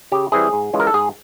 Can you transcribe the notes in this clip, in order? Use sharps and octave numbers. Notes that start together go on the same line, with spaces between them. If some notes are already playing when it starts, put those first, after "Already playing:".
C#3 G4
E3 G3 C4 E4 G#4
G#2
E3 G#3 C#4 F4
A#4
A4
G#2 G#4